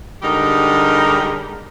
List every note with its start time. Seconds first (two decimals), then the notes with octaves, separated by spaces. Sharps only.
0.22 D3 G3 G#3 D#4 G4 A#4